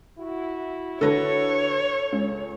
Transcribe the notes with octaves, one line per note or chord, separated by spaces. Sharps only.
E4 F#4
D3 A4 B4 C#5 A5 A#6
C#2 C#4